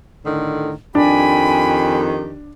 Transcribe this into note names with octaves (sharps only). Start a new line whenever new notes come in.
A2 D3 D#3
F2 D#3 D4 G4 G5 G#5 B5